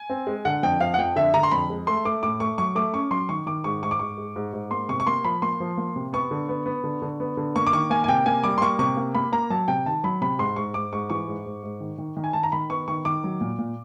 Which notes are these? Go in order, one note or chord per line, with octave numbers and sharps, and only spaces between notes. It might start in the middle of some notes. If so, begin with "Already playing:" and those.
Already playing: G#5
C4
G#3
D3 F#5
F2 G5
F3 F5
F#5
F2 G5
D3 E5
D3 A#5
C6
F2 B5
G#3
A3 C6
A3 D6
A2 D6
A3 C#6
F#3 C#6
A3 D6
C#4 C#6
F#3 C6
D#3 C#6
D#3 D6
G#2 C#6
G#2 C#6
D6
G#2 C#6
G#3
G#2
G#2
A#3 C6
C3 C#6
C#6
A#3 C6
F3 B5
A#3 C6
F3
A#3
C3
B3 C#6
D3
B3
B3
D3
D3
B3
D3
A#3 C#6
D6
D#3 C#6
A#3 G#5
G#5
C3 G5
A#3 G#5
G3 D6
C6
A#3 C#6
C3 C#6
A#3
A#3 B5
A#3 A#5
F#3 A5
C3 G5
D#3 A5
F#3 B5
C3 B5
G#2 C6
G#2 C#6
G#2 D6
G#2 C#6
E3 C#6
G#2
G#2
G#2
D#3
D#3
D#3
G#5
D#3 A5
A#5
D#3 B5
B3 C#6
D#3 C#6
D#3 D6
F#3
A#2
A#2